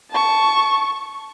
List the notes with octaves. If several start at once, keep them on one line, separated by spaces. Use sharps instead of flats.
A5 C#6